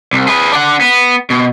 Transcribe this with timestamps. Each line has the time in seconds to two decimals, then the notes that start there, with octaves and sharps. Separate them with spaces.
0.13 C2
0.28 G#4 B4
0.52 D4 F#5
0.81 B3
1.30 B2